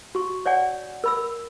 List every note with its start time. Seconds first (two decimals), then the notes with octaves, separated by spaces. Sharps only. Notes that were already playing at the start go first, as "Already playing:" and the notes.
0.15 F#4 C#6
0.46 C#5 D5 F#5 G#5
1.04 A#4 B5 E6